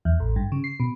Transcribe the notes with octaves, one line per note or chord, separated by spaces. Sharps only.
E2
A1
G2
C#3
C7
B2